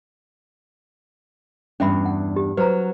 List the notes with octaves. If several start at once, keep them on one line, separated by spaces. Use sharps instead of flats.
E2 G2 C#4 D4 E5 B5
F#5
G4
F#3 B4 C5 A#5